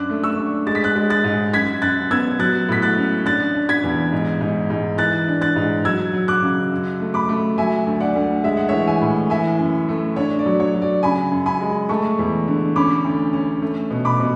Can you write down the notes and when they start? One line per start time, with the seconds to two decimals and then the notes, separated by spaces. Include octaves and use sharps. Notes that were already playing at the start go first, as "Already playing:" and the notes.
Already playing: F#2 D4 D6 F#6
0.10 A3
0.24 C#6 E6
0.37 D4
0.67 G#3 A6
0.75 B6
0.84 F#6 A6
0.96 G#3
1.10 F#6 A6
1.24 G#2
1.54 F#2 G#6 B6
1.82 F#2 F#6 A6
2.11 B3 E6 G#6
2.39 F#3 F#6 A6
2.69 A2 B6
2.82 F#6 A6
2.97 C#4
3.25 D4 F#6 A6
3.54 D4
3.69 G#6 B6
3.84 E2
4.12 G#2
4.41 G#2
4.70 G#2
4.98 E3 F#6 A6
5.28 D4
5.41 F#6 A6
5.56 G#2
5.85 F#3 E6 G#6
6.13 F#3
6.28 D6 F#6
6.42 C#3
6.72 F#2
7.00 A3
7.14 B5 D6
7.29 A3
7.58 F#3 E5 G#5
7.87 D2
8.01 D5 F#5
8.16 D2
8.44 G#3 E5
8.57 F#5
8.68 E3 C#5 E5
8.87 E5 G#5
9.02 A2
9.30 E3 E5 G#5
9.59 F#2
9.89 A3
10.16 D4 C#5
10.39 D5
10.46 F#3
10.60 C#5
10.75 F#3
10.82 D5
11.03 C#3 G#5 B5
11.32 F#2
11.46 G#5 B5
11.61 G#3
11.89 A3 A5 C#6
12.19 E2
12.48 D3
12.76 C#4 B5 D6
13.04 D2
13.33 C#4
13.62 A3
13.91 B2
14.05 B5 D6
14.20 B2